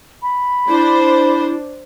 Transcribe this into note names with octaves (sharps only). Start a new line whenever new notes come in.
B5
D4 E4 C5